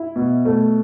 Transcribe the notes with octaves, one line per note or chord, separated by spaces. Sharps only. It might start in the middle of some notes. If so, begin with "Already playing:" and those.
Already playing: E4
B2
A3